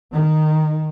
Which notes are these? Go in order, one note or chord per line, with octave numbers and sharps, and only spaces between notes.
D#3